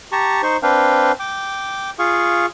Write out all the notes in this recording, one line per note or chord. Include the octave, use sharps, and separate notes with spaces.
G4 A5 A#5 C#6
D#4 C5 C#6
C4 D4 B4 F5 G5
G5 D6
F4 G#4 F5 C#6